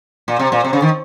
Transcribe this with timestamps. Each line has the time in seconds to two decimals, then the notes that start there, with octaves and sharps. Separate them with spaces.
0.28 A#2
0.40 C3
0.52 A#2
0.64 C3
0.73 C#3
0.82 D#3